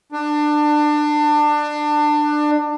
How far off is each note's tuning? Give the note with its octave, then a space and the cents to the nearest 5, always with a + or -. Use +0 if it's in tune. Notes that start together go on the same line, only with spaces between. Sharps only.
D4 +25